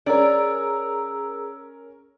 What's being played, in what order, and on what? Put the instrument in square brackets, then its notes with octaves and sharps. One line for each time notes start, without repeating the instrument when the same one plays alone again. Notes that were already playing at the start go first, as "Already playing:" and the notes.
[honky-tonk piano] C#4 A#4 [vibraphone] G#4 A#5 E6 [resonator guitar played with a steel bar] D5